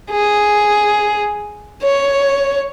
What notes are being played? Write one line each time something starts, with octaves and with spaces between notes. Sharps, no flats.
G#4
C#5